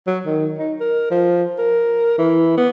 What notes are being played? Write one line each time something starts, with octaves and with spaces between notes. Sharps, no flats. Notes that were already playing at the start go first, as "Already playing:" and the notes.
F#3
D#3
D#4
A#4
F3
A#4
E3
B3